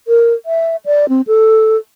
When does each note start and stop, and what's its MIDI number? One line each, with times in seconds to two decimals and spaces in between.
0.08 0.33 70
0.46 0.76 76
0.86 1.09 74
1.09 1.21 60
1.27 1.76 69